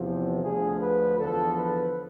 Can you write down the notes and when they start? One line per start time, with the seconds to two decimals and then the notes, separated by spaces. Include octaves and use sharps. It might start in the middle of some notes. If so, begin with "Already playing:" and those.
Already playing: E2 C3 F3
0.43 D2 D3 F3 G#4
0.81 B4
1.18 E2 D3 F3 A4
1.57 B4